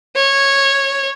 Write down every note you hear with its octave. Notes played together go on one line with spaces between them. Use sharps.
C#5